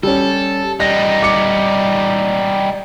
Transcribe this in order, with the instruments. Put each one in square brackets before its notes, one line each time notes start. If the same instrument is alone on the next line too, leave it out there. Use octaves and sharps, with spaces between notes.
[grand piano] G3 C#4 [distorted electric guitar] A4
[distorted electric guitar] G3 D#4 [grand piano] A#6
[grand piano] D6 C#7